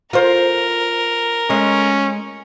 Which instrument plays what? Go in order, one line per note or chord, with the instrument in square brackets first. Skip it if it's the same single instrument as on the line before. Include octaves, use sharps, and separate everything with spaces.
[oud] F4 C5 [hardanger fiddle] A#4
[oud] G#3 [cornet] C#4